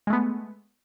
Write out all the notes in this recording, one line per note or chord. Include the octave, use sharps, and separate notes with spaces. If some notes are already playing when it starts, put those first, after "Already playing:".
G#3 A3 B3